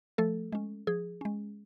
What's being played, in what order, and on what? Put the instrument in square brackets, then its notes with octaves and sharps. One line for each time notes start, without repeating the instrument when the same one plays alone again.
[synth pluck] F3 A3 A4
G#3 C#4
F3 G#4
G#3 C#4